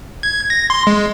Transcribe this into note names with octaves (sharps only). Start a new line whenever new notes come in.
G#6
A#6
C6
G#3